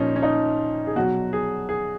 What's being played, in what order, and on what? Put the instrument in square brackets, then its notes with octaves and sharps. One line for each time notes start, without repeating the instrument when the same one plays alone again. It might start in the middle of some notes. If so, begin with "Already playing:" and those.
Already playing: [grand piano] A#2 F3 C#4 D#4
C#4
D#4
G#4
B2 F#3 F#4
G#4
G#4